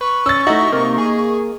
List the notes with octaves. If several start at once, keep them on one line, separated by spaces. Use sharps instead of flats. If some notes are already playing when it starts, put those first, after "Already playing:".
B4 C#6
C#4 E6 A6
A3 D#4 E4 F#4
C3 A#3
G#4